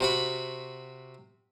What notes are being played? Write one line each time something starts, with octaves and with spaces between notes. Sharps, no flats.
C3 F#4 B5